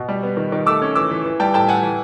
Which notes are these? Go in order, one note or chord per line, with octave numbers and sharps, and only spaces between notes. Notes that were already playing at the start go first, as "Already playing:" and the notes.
Already playing: B2
G3
B3
D#3
D#3
A3 D6 E6
C#4
E3 D6 E6
E3
E3
G3 G5 A5
A2 G5 A5
A2 F#5 G#5
E3